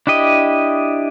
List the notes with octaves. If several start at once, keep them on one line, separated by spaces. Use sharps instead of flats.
D4 E4 G4 D#5